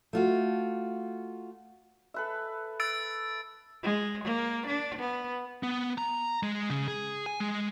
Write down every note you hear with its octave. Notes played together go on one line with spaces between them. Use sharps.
A3 F4 F#4
A4 B4 E5
E6 A6 D7
G#3
A#3
D4
B3
B3
A#5
G#3
C#3
G#4
G#5
G#3